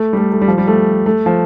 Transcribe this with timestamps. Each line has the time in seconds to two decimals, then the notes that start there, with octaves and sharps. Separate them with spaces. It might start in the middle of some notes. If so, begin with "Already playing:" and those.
Already playing: A3
0.13 G3
0.18 A3
0.32 A3
0.42 G3
0.48 F3
0.58 G3
0.67 A3
1.06 A3
1.26 F3